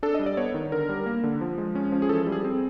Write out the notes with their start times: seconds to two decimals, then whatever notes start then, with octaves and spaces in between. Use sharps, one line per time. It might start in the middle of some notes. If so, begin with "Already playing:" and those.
0.03 D4 A4
0.15 G3 D#5
0.26 D5
0.37 B3 C#5
0.54 D#3
0.72 D3 A#4
0.89 G3
1.06 A#3
1.23 D3
1.41 F3
1.58 G#3
1.75 C#4
1.92 F3
2.02 G#4
2.09 E3 A4
2.27 G3
2.32 G#4
2.44 C4